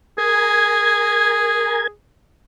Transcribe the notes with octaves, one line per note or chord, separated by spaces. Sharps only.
G#4 A#4 G#5 G#6